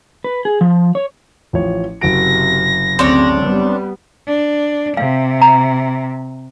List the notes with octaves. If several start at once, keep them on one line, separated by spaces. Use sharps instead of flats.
B4
G#4
F3
C#5
A1 F3 C#5
F#1 C3 F#4 A#6 D7
D2 C#3 C4 D4 C#5
G3 B3
D4
C3 F5
A#5